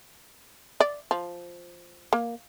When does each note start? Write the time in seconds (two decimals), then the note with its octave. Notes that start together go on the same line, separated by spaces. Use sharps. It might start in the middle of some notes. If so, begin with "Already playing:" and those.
0.80 D5
1.11 F3
2.13 A#3